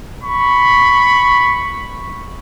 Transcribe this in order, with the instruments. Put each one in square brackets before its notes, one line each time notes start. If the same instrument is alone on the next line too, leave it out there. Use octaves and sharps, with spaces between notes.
[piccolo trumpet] B5 [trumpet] C#6